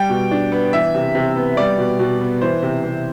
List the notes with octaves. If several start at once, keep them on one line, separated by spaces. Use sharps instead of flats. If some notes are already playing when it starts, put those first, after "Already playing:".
Already playing: G3 G5
B2
D4
B3
E3 E5
C3
C3
B3
G3 D5
B2
B2
B3
E3 C5
C3
C3